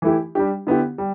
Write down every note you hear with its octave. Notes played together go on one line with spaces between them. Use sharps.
E3 A3 E4 G4
G3 D4 G4
D3 B3 E4 G4
G3